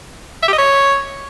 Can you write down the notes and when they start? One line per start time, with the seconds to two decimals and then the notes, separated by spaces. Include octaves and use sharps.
0.43 E5
0.48 G4
0.53 D#5
0.58 C#5